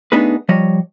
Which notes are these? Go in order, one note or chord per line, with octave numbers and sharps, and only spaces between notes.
A3 B3 D4 D#4 G#4 B4
F3 G3 C#5 D#5